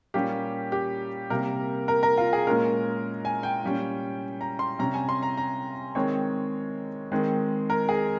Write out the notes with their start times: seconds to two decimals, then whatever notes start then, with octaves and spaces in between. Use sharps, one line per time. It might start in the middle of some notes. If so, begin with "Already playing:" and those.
0.14 A#2 G3 A#3 C#4 G4
0.72 G4
1.30 C3 G3 A#3 A#4
1.88 A#4
2.03 A#4
2.17 F4
2.33 G#4
2.47 A#2 G#3 C#4 A#4
3.25 G#5
3.43 G5
3.63 A#2 G3 C#4
4.41 A#5
4.59 C6
4.79 C3 G3 C#4 A#5
4.94 G#5
5.09 C6
5.23 A#5
5.37 A#5
5.95 D#3 G#3 C4 C#5
7.12 D#3 G#3 C4
7.70 A#4
7.89 G#4